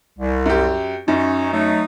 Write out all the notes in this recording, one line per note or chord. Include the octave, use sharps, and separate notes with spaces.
C2
F#2 G4
F#2 C#4 D#4
F#3 A3 D#4